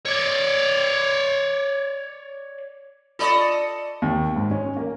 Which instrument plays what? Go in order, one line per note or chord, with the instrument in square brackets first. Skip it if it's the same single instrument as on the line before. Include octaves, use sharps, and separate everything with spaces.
[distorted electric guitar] C#5 D5
[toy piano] F4 B5 C#6 [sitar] A4 D5 D#5
[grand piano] D#2
G#2
C#4
A#3